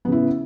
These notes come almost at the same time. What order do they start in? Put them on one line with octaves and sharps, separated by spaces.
B3 C#3 E4